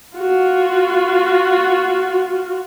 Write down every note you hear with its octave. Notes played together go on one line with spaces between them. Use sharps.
F4 F#4